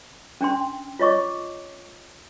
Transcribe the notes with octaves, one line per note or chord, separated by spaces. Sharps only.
C#4 D4 G5 C6
F4 C#5 D#5 C#6 D6